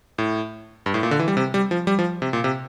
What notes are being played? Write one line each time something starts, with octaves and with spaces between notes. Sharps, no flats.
A2
G2
A2
A#2
D3
E3
G3
C3
G3
F3
G3
F3
C3
A#2
C3